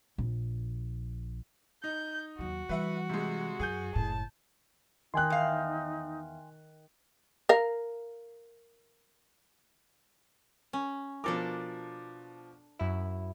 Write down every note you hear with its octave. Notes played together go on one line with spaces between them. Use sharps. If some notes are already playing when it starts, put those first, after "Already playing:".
A#1
D#4 G6
D#2 F#3 F#4
E3 G3 B4 E5 F#5
C3 G#3
F#2 G#4 G#5 G6
F#1 A2 A5
D#3 D#4 G5 G#5 C6 F#6
E2 F5
A#4 F5
C#4
B2 F3 D4 A4 A#4 D6
F#2 E4